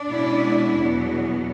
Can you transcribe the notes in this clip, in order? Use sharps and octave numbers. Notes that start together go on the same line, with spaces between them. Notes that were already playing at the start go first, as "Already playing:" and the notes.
Already playing: D4 D5
B2 G#3 C#4 E4
E2 B2 F#3 B3